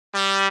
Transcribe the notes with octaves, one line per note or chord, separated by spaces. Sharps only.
G3